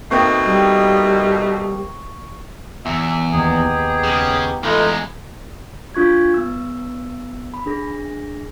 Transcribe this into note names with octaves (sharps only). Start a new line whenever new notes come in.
B2 A3 A#3 C4 D#4 G5 C#6
G3
E2 E5
D#2 B3 D#4 G4 G#4
C#3
E2 G#3 A3 B3 D#4 F4
D4 F4 C#6 G#6
B3 E6
B5
D4 G#4 A#6